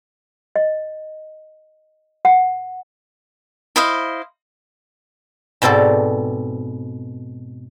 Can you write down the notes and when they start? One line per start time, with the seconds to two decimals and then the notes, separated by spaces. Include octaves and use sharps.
0.56 D#5
2.25 F#5
3.76 E4 C5 D#5 F5
5.62 G#2 B2 C4 A4 D5